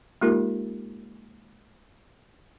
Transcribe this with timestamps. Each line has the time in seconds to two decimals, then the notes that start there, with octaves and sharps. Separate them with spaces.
0.21 G#3 A#3 D#4 F4 G4 A#4